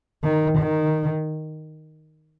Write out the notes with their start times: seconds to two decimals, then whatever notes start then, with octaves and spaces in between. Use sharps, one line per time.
0.23 D#3
0.59 D#3